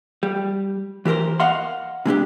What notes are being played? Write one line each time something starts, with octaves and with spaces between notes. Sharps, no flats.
G3
E3 G4 A4 A#4 C5
D#5 F5 F#5 C6
C3 G#3 D4 G4